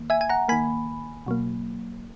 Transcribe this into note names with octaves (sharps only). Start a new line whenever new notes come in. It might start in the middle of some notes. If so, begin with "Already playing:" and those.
Already playing: D#3 A#3
E5 G#5
G#5
F#5 A#5
D#3 A#3 G#5 B5
B2 F#3 A#3